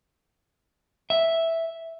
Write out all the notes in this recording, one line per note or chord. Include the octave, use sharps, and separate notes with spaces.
E5